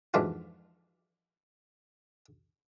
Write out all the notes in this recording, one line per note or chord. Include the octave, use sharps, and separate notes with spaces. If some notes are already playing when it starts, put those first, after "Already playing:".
F2 G#2 E3 D4 F4 F#4